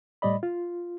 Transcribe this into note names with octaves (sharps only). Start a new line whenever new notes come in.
A2 G3 D5 D#5 B5
F4